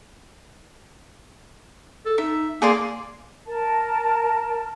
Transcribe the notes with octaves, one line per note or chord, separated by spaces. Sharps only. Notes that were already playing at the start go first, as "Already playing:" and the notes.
A4
D#4 E5
A#3 G#4 D5 C6
A#4 A5